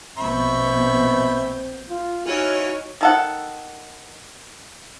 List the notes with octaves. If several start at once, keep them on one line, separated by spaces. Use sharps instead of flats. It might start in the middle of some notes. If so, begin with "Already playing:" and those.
A#1 B2 C4 E5 B5 C#6 G6
F4
E3 C#4 D#4 F#4 C#5 F6
D#3 A4 F#5